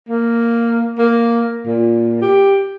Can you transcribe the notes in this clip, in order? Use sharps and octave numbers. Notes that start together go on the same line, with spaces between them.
A#3
A#3
A#2
G4